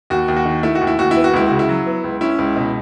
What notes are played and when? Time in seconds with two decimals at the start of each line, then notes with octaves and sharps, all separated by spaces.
0.10 D#2 F#4
0.28 D#2
0.36 F#4
0.45 D#3
0.63 A3 E4
0.75 F#4
0.81 D#2
0.87 E4
0.99 D#2 F#4
1.11 E4
1.16 B3
1.24 F#4
1.33 C#2 E4
1.48 C#3 F#4
1.59 E4
1.69 F#3
1.87 B3
2.04 C#2
2.21 C#4 E4
2.38 C#2
2.56 B2